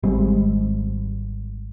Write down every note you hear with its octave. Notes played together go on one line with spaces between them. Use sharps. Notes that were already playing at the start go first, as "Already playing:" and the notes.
G#1 G3 G#3 C4